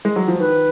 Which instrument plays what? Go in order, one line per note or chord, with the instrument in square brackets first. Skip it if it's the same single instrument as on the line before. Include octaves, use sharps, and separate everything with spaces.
[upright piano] G#3
F#3
F3
[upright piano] D#3 [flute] B4